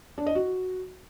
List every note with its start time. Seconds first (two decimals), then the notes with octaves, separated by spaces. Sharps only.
0.18 D4
0.26 D#5
0.35 F#4